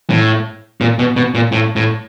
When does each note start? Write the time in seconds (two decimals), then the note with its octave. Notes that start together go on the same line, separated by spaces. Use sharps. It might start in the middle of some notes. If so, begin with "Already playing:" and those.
0.10 A2
0.81 A#2
0.99 B2
1.16 B2
1.35 A#2
1.52 A2
1.76 A2